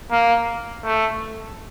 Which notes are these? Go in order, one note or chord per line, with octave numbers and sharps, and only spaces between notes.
A#3
A3